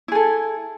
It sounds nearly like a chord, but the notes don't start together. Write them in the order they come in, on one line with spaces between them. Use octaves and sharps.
E4 G#4 A4